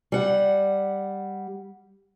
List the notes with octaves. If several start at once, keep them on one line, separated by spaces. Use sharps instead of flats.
G3 F#5